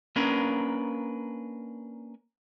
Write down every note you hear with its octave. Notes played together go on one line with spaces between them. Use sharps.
A#3 C#4 D4 A#4 B4